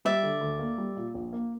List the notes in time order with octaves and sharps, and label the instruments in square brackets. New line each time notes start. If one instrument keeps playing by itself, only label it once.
[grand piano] G3 [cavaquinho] D5 E5
[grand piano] D3
D2
A#3
G3
A#2
A#1
A#3